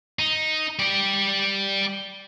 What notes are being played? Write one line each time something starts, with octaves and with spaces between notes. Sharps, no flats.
D#4
G4 D5